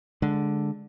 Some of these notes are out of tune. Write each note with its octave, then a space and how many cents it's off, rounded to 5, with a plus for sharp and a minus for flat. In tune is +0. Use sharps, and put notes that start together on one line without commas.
D3 +0 G#3 +0